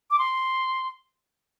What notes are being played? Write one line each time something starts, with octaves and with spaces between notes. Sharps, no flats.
D6
C6